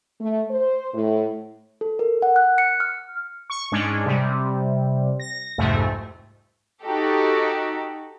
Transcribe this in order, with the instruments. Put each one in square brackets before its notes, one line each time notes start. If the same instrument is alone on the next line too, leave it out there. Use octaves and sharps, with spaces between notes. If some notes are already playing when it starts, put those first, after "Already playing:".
[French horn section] A3
C5
A2
[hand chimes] A4
A#4
F#5
F#6
C#7
F6
[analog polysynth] C#6
G#2 G#3 C#4 D4
C3 G3
A#6
C2 F2 G#2 C3 A3
[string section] D#4 F#4 G4 A4